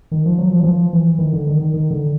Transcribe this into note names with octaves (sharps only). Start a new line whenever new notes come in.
D#3
F3
F#3
F3
E3
F3
E3
D#3
D3
D#3
D#3
D#3
D3